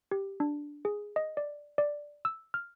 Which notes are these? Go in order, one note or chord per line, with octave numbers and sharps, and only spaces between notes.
G4
D4
G#4
D#5
D5
D5
E6
F6